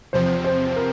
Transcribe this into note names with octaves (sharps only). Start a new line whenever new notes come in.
E2 C3 F3 C4 C5
C5
A#4